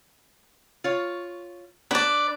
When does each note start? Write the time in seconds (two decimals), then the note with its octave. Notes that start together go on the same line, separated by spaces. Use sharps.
0.84 F4 C#5
1.91 D4 B4 D5